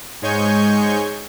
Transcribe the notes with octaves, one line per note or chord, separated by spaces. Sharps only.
G#2 G#3 C#5 G#5 C#6 G6